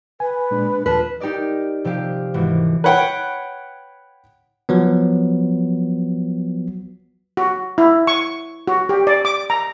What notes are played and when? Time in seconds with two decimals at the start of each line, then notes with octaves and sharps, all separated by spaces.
0.20 B4 G#5
0.51 A#2 G#3 D4
0.86 D#2 F3 B4 A5
1.20 D#4 G4 A#4 D5 D#5
1.85 C3 F3 F4 G4
2.34 G#1 E3 F#4
2.84 B4 C#5 F#5 G5
4.69 F3 F#3 B3
7.37 F#4
7.78 E4
8.07 C#6
8.68 F#4
8.89 G4
9.07 D5
9.25 D6
9.50 A#5